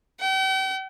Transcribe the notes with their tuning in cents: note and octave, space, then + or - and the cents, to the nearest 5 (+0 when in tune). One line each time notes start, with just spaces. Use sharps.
G5 -40